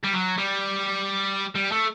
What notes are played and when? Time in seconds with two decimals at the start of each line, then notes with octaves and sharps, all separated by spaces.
0.04 G3
0.13 F#3
0.38 G3
1.56 G3
1.72 A3